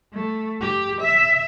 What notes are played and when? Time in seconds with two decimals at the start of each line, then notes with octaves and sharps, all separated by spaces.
0.13 A3
0.61 G4
1.01 E5